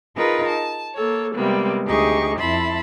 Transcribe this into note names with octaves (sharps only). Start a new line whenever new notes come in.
D#4 F4 G#4 A#4 B4
A5
A#3 A4 C#5
C3 G3 G#3 A#3 B3
D2 D#4 G4 G#4 C#6
F2 E4 E5 A5 B5 C6